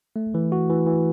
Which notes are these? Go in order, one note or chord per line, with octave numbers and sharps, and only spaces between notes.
A3
E3
F#4
E3
E3